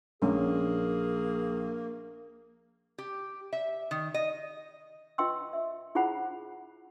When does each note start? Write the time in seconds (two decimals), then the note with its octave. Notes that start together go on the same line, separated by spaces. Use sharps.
0.22 A#1 A#3 C#4 G#4
2.98 G4
3.53 E5
3.91 D#3
4.14 D#5
5.18 F4 B4 D#5 G5 C6 E6
5.53 E5
5.95 E4 F4 G#4 C5 F#5 B5